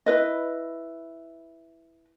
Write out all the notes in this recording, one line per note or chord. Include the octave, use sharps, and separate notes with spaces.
E4 B4 D#5